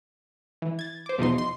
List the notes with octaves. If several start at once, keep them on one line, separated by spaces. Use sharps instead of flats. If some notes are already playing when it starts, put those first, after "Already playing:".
E3
G#6 A6
C5 D6
E2 B2 F3 D#4 C6
C6